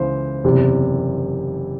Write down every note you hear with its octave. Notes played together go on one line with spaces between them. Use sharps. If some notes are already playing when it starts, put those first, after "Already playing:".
Already playing: C#2 C#3 E3 C5
F#1 E2 C3